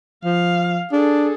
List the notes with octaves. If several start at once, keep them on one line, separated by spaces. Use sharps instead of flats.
F3 F5
D4 G#4 A4